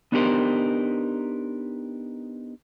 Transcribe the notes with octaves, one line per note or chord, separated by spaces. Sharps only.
B3 D4 D#4 G4 A#4 C5